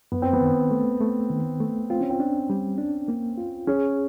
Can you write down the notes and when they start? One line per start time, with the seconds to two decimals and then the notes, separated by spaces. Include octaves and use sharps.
0.12 F#2 B3
0.22 C4
0.33 B3
0.41 D#3
0.71 A3
1.01 A3
1.30 D#3
1.60 A3
1.90 C4 F4
2.00 C#4
2.10 C4
2.20 D4
2.50 G3
2.78 D4
3.08 A#3
3.38 F4
3.67 C#4 G#4